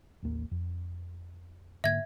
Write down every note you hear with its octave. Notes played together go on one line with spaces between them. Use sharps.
A1 D#2 A#3
F2
G#2 D3 A#3 E5 G#6